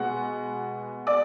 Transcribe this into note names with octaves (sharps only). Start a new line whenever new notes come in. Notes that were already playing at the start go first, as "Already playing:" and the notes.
Already playing: B2 G#3 B3 F#5
D5 D6